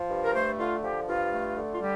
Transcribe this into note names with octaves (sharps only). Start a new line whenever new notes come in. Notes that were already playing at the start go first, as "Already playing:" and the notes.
Already playing: F3
G2
A#4
A3 C5
D3 F4
F3 G4
G2 F4
A3
D3
F4
G3 G4